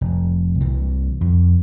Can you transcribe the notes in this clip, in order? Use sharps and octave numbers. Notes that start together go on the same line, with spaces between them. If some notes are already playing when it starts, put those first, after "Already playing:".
F1
C2 C3 E3
F2